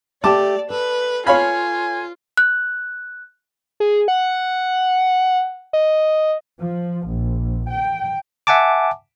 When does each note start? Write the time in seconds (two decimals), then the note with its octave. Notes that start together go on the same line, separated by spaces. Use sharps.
0.24 A3 G4 D5 A5 D6
0.70 A4 B4
1.27 F4 C#5 F5 G#5 B5
2.37 F#6
3.80 G#4
4.08 F#5
5.73 D#5
6.59 F3
7.06 A#1
7.70 G5
8.47 E5 F#5 G#5 A5 D6